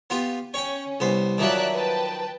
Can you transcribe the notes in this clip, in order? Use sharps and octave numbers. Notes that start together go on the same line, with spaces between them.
B3 F4 G4
C#4 C#5 G5
C2 B3 C5
D#3 F3 F#3 D5 E5 F#6
B4 G5 A5